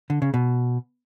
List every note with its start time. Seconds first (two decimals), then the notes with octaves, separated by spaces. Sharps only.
0.10 D3
0.22 C#3
0.34 B2